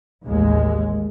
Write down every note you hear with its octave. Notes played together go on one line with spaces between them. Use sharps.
A1 D#2 G#3